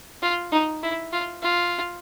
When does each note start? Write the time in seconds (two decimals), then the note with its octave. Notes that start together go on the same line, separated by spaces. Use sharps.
0.22 F4
0.52 D#4
0.83 E4
1.13 F4
1.43 F4